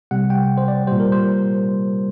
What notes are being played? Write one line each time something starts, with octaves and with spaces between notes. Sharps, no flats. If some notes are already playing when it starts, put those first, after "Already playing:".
C3 G3 F#5
G5
C5
D5
A#2 G3 C5
A#4
C5